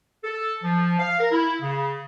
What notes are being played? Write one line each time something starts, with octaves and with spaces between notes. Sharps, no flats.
A4
F3
F5
A#4
E4
C#3